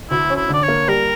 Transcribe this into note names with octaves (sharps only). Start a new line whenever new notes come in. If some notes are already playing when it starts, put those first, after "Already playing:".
D2 E4
C#4
E4
D3
D5
C#5
A#3
G3 A#4